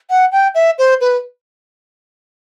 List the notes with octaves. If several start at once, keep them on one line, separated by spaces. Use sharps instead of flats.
F#5
G5
E5
C5
B4